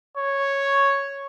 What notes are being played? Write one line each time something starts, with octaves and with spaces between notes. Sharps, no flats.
C#5